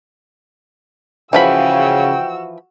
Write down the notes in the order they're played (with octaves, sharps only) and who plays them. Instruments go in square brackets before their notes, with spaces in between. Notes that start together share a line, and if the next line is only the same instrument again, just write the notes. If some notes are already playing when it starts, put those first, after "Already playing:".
[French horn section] C#3 [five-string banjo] E3 F3 B5 [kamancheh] F#4 E6 [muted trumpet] G5